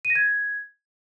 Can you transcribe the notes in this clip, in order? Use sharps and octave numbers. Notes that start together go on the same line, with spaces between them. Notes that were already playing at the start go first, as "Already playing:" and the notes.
D#7
A#6
G#6